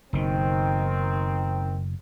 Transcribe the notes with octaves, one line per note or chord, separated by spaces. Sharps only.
F#1 B2 D#3 C4